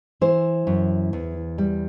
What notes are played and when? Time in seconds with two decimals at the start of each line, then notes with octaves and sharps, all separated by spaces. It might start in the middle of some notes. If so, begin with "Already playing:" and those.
0.21 E3 C5
0.67 F#2
1.13 E2
1.58 G3